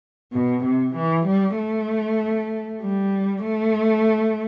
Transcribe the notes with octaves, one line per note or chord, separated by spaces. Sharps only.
B2
C3
E3
G3
A3
G3
A3